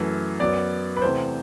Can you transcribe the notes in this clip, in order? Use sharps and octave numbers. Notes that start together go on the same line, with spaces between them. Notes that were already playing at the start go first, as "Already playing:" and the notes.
Already playing: F#2 E3 A3
F#2 F#3 B3 D5
B4
E2 C3 E3 A3 C5